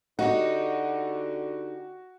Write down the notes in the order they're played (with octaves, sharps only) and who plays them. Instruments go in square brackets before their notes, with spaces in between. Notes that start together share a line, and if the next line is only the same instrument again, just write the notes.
[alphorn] D3 [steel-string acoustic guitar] D#4 G4 [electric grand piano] F#4 F#5